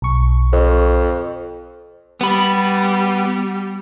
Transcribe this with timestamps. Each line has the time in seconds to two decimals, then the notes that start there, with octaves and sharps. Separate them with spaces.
0.02 B1 C#6
0.53 F2
2.21 G3 B3 B5